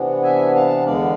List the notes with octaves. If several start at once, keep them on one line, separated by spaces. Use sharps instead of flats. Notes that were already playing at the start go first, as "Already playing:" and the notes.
Already playing: C3 E3 B3 D4
E5 G#5
F5 A5
E2 D3 G#3 B3 D4 D5 F5